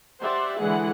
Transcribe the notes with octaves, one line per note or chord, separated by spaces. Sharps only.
G4 C5 D5 E5 F#5
D3 E3 G#3 E4 G#4 F#5